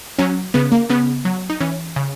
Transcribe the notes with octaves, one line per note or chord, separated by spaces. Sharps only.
F#3 C#4
C#3 B3
A#3
C#3 B3
F#3
D#4
E3 C#4
C#3